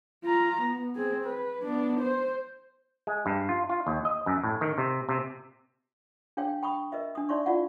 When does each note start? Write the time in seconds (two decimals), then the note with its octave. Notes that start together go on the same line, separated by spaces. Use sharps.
0.23 F4 A#5
0.61 B3
0.96 C4 G#4
1.25 B4
1.62 B3 D4
2.00 C5
3.07 G#3
3.26 G2
3.49 F4
3.69 F4
3.87 D#2
4.05 D#5
4.26 F#2
4.43 A2
4.61 D#3
4.78 C3
5.09 C3
6.37 D4 G#4 C#5 F5 G5
6.63 G5 B5 C#6 D#6
6.92 A#4 D#5 E5
7.15 D4 D#6
7.29 D#4 C#5 D5 E5 C6 C#6
7.46 E4 F4 D5 F5 F#5